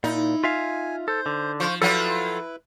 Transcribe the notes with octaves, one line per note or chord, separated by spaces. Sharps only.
A#2 D#4 E4
F4 E5 F5 G#5
A4 C5
D3
F3 F4 C5 C#6
F3 F#3 E4 F4 A4 B4